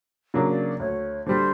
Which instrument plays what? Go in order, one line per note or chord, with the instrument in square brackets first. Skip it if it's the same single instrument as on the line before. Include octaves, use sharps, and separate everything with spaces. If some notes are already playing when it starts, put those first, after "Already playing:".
[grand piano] C#3 F#3 A#3 D4
[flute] D5
[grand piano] D2 [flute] C#5
[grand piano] D3 G3 [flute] C5